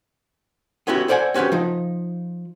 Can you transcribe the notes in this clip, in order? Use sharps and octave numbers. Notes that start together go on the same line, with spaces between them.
B3 C#4 E4 F#4 G4
A4 C5 D5 D#5 F#5 G#5
C4 C#4 F#4 G4 B4
F3 D#4